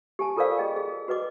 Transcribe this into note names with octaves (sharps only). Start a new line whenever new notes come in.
G4 G#5 A5
F4 A4 A#4 C5 D5 F5
G#4 D#5 G5
G#4
F#4 B4 D#5 D6